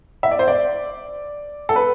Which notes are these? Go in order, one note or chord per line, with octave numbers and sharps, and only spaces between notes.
E5
D5
C5
D5
A4
B4